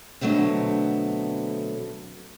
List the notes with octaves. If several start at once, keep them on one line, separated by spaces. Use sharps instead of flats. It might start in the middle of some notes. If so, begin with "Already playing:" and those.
B2 D3 F#3 A3 B3 C4